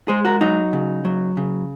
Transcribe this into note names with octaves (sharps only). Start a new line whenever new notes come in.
G#3 G#4 C5
F#4 A#4
F#3 D#4 F#4
C#3
F#3
C#3